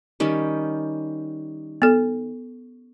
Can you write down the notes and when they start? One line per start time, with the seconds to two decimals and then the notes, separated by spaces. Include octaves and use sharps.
0.20 D#3 G3 C#4
1.82 B3 A4